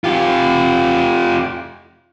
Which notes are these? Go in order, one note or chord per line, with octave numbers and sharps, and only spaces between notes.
F4 G4